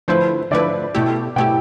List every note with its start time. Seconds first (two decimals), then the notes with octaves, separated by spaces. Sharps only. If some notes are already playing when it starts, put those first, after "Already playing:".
0.08 D3 F3 A3 E4 B4 C5
0.51 D3 F3 A3 E4 B4 D5
0.94 B2 A3 E4 G4
1.36 B2 A3 E4 G4 G5